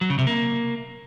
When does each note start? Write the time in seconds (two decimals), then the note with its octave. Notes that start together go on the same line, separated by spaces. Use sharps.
0.01 F#3
0.10 C#3
0.18 C3
0.27 A#3